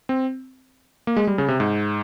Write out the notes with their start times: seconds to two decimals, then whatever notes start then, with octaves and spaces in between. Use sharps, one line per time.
0.09 C4
1.07 A#3
1.17 G#3
1.27 G3
1.38 C#3
1.48 C3
1.60 G#2